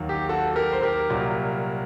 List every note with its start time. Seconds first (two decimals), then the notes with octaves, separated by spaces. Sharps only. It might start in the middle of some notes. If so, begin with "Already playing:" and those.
Already playing: D#2 D#3 F#3
0.09 G4
0.29 F#4 A4
0.56 G4 A#4
0.72 C5
0.82 G4 A#4
1.10 C2 A#2 F#3